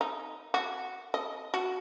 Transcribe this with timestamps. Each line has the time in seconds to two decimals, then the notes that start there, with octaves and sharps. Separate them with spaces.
0.01 D#4
0.54 F#4
1.14 D#5
1.54 F#4